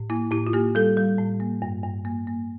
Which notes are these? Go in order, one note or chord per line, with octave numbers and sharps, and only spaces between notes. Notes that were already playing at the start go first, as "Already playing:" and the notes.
Already playing: A2
A#3 E4
A2 E4
F4
A#3 G4
G3 A4
G3
A2
A#3
G2
G2
A#3
A#3